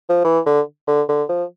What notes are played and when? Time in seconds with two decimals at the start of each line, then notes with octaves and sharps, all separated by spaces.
0.09 F3
0.25 E3
0.46 D3
0.87 D3
1.09 D3
1.29 F3